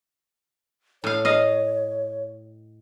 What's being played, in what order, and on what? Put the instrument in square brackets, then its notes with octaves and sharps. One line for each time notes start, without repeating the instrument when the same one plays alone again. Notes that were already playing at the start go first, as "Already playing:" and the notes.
[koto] A2 F5 [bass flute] C#5
[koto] D#5 F5